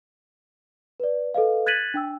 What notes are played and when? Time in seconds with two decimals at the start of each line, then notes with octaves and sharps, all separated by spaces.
1.00 B4 D5
1.34 A4 B4 D#5 F5
1.66 F#6 G#6 A6 B6 D#7 F#7
1.94 D4 G5 E6